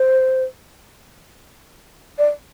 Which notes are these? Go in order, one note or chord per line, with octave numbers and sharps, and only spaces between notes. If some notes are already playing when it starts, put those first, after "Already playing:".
Already playing: C5
D5